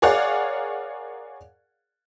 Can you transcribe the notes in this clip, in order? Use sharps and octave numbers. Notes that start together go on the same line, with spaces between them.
G#4 A#4 C#5 D5 F5 F#5